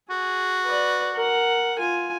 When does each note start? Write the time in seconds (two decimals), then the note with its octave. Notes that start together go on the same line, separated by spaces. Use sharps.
0.10 F#4 G#4
0.66 B4 D5
1.13 A#4 F#5
1.79 F4 G#5